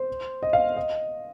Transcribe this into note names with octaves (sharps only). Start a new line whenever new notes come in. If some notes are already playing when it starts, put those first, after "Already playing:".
Already playing: C5
D#5
F5
D#5